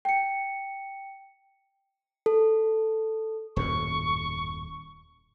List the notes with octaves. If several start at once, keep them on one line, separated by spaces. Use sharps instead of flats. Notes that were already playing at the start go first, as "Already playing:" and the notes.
G5 C#7
A4
D#1 F#2 A2 C#6